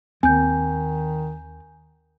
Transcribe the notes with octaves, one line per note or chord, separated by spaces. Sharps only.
D#2 D#3 C4 G#5 G6